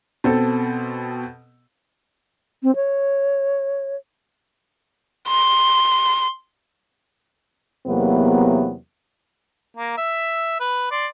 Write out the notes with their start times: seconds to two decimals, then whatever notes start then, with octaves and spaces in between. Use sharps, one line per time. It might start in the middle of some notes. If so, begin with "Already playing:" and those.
0.24 B2 C4 A4
2.63 C4
2.76 C#5
5.28 C6
7.87 E2 C3 F#3 A#3 B3
9.77 A#3
9.97 E5
10.60 B4
10.91 D5 C6